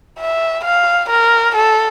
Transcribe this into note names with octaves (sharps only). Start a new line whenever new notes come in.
E5
F5
A#4
A4